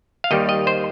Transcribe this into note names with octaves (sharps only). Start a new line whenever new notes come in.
F5
D#2 D#3 G3 D#5
D#5
C5